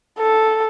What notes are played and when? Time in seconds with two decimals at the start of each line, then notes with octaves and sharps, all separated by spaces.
0.19 A4